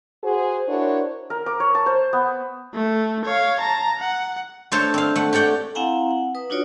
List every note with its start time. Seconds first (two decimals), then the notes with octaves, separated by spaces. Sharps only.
0.23 F#4 G#4 C5
0.69 D4 E4 F#4 A#4 C5 C#5
1.30 A#4
1.46 D6
1.60 C#5
1.75 A5
1.86 C5
2.13 B3
2.74 A3
3.25 C#5 F5
3.60 A5 A#5
3.99 F#5
4.72 A3 D4 A4 C5 C#5 A5
4.94 C4 F5
5.16 A3 F#5
5.33 G4 C#5 D5 F#5 G5
5.75 C4 E4 F5 F#5 G#5 A#5
6.11 F#5
6.35 B4 D#6
6.50 D4 D#4 F4 F#4 C#5 D5